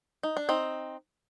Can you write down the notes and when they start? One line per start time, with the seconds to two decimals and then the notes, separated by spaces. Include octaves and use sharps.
0.23 D#4
0.37 D4
0.49 C4 D#4